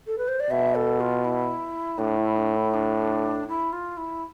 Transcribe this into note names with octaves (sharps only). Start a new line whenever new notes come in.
A4
B4
C5
D5
B2 E5
A4
F4
E4
A2 D4
E4
D4
E4
D4
E4
F4
E4